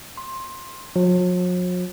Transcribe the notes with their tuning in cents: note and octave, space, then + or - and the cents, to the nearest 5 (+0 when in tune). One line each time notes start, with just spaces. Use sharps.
C6 +15
F#3 -45